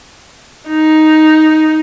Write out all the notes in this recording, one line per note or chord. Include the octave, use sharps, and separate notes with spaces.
D#4